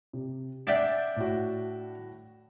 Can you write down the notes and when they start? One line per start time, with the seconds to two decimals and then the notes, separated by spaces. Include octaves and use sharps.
0.13 C3
0.67 D4 D5 E5 F#5 G5
1.16 A2 F#4